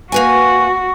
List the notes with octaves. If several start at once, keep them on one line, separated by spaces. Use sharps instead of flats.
A#3 F#4 B4 G#5